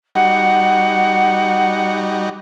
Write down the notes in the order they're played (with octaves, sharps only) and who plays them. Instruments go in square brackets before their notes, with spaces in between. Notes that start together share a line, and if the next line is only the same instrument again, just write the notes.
[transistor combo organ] G3 D#4 F#4 [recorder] F#5